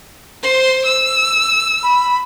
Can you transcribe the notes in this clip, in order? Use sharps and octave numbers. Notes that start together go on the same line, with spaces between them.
C5 C6
E6
B5